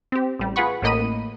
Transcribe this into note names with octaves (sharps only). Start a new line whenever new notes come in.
C4 G4
A1 G3
F4 G#4 B4 F#5 B5 C#6
A1 A2 A#3 D#5 B5 D#7